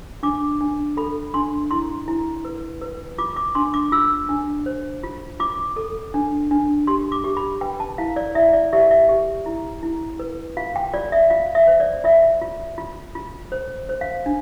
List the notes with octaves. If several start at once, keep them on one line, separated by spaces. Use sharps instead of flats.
D4 D6
D4
A4 B5
D4 C6
E4 C6
E4
B4
B4
F4 D6
D6
D4 C6
D6
F4 E6
D4
C5
F4
F4 D6
A4
D4
D4
G4 C6
D6
G4
B5
B4 G5
A5
E4 F5
D5
E4 E5
D5
G4 E5
E5
G4
E4
E4
B4
F4 F5
G5
F4 D5
E5
F4 F5
E5
C5
D5
F4 E5
F4
F4
F4
C5
C5
F5
D4